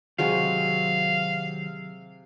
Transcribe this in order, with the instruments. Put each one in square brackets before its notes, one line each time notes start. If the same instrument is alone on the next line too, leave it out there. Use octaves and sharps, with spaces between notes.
[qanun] C3 G#3 F#4 [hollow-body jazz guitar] D#3 F#3 [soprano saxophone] F5